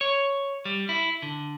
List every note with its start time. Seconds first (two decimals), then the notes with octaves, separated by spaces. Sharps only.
0.01 C#5
0.65 G3
0.89 E4
1.22 D3